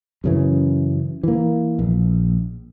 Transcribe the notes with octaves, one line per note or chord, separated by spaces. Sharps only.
F#2 C#3 E3
E3 A#3
A#1